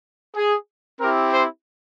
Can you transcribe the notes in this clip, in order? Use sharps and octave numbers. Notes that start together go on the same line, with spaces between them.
G#4
C4 E4 G4 A#4
C5